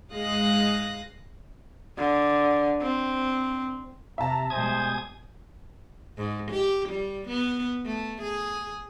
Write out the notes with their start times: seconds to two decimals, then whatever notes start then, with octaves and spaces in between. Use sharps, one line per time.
0.11 G#2 G#3 F5 D#6 F#6 A#6
1.98 D3
2.81 C4
4.18 C3 E5 A5 A#5
4.50 B2 G3 G#3 C5 G#5 D#6
6.18 G#2
6.51 G4
6.89 G3
7.28 B3
7.86 A3
8.22 G#4